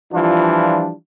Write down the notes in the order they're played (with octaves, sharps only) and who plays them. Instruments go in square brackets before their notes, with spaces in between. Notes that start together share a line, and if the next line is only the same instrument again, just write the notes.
[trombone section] E3 F3 G3 D4 F4